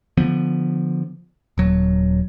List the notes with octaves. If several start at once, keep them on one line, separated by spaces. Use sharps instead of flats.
D3 F3 B3
D#1 F#3